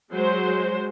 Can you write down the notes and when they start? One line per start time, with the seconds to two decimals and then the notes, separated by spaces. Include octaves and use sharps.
0.11 F#3 G#3 C5